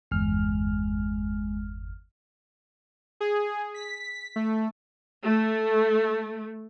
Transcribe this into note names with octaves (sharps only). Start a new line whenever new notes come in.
G1 E2 G#3 F6
G#4
B6
A3
A3